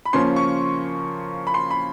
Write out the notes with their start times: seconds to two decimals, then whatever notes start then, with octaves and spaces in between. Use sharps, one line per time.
0.05 B5
0.13 C#3 F3 A#3 C#4 C6
0.36 C#6
1.47 B5
1.54 C6
1.71 B5